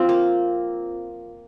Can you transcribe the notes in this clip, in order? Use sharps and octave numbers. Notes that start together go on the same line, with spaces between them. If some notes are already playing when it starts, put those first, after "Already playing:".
Already playing: F3 C4 F4
A#3